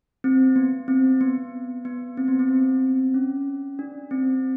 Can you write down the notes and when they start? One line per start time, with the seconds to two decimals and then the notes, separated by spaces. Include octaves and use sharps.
0.24 C4
0.56 B3
0.88 C4
1.21 B3
1.85 B3
2.17 C4
2.28 B3
2.39 C4
2.49 C4
3.14 C#4
3.79 D4
4.11 C4